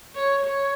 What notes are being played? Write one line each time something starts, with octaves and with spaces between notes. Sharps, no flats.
C#5
C#5